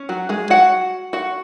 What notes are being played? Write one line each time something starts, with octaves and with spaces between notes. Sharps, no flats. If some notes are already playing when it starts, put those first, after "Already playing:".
Already playing: C#4
F#3 F#4
G#3 G#4
F#4 F#5
F#4 F#5